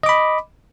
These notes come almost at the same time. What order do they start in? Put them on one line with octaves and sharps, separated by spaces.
D#5 D6 B5